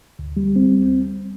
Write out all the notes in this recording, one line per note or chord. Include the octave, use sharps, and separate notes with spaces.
D2
G3
C4